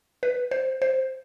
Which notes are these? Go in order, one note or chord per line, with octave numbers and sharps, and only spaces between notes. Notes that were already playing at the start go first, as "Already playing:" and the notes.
B4
C5
C5